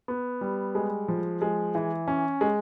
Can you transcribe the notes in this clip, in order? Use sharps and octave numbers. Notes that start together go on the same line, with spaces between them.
B3
G3
G#3
F3
G#3
E3
C#4
G#3